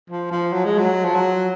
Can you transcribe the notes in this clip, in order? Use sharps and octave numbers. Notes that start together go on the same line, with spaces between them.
F3
F3
F#3
G#3
F#3
F3
F#3